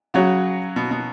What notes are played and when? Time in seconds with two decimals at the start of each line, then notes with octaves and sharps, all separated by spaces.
0.14 C#3 F#3 C#4 F#4 C#5
0.76 B2
0.91 B2